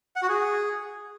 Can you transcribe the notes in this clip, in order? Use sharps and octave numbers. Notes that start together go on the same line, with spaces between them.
F#5
F#4
G#4